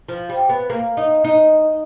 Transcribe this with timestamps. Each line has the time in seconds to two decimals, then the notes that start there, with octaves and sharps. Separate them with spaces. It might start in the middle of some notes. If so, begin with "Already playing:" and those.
0.09 F3
0.29 G3
0.49 B3
0.70 A#3
0.97 D#4
1.24 D#4